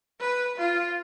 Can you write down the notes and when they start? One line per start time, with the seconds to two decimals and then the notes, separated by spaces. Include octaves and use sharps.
0.20 B4
0.58 F4